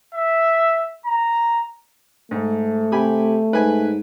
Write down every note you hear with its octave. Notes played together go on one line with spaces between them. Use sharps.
E5
A#5
G#2 A3
C3 G4 G#5 B5
G#2 B4 G#5